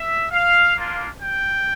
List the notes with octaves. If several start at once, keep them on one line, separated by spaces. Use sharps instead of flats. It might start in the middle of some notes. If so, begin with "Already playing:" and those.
Already playing: E5
F5
A#3 D4 F4
G5